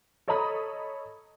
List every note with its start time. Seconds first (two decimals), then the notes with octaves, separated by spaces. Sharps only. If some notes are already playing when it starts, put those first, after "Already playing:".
0.28 A4 C#5 D#5 A#5 B5 D#6